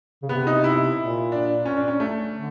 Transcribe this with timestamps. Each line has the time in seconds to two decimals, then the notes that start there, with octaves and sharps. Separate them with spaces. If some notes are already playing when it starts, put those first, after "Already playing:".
0.23 C#3
0.29 C3 B3
0.47 D#4
0.64 E4
0.98 A#2
1.32 D4
1.65 C#4
1.77 D4
1.88 C#4
2.00 A3
2.34 D3